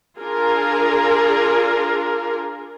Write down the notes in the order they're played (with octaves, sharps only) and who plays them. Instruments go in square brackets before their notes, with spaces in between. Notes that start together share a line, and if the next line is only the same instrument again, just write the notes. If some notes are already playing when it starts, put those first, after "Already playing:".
[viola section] D4 F4 G#4 A#4